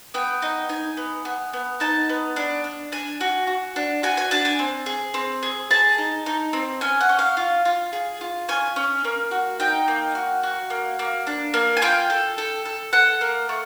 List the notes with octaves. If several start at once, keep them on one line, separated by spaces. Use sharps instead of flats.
B3 G5
D#4
D#4 G#5
B3
B3
B3
D#4 A5
B3
D4
D4
D4 G#5
F#4
F#4
D4
F#4 G#5
G#5
D4 A5
G#5
C4
G#4
C4
G#4
G#4 A5
D#4
D#4
C4
C#4 G#5
F#5
C#4
F5
F4
F4
G#4
F4
C#4 G#5
C#4
A#3
F#4
D#4 G5
A#3
F#4
F#4
A#3
A#3
D4
A#3
G#5
F4 G5
A4
A4
A4
A4 F#5
A#3
A3